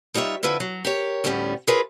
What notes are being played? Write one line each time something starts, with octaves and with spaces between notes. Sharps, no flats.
G3 D#4 F4 C#5 E5
F2 D3 E4 F4 B4 E5
F#3
G4 A#4 C#5
D2 A2 D3 G3 B3 C#4
E4 F4 G#4 A#4 B4 C#5